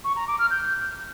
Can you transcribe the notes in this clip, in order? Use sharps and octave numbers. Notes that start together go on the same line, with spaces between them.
C#6
A#5
D6
F6
G6